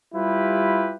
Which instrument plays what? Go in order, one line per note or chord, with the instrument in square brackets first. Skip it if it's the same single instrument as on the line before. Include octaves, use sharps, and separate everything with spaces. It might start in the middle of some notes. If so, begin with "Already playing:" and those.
[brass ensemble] G3 E4 F4 G4 B4